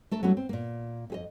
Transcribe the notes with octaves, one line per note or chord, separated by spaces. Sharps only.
A3 A4 A#4
F#3 G3 A3 C#4 E4 F#4
C4
A#2 A#3
F2 G#4 D#5